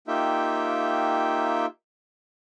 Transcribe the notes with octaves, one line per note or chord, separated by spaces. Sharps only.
A#3 D#4 F4 G4 E5 G5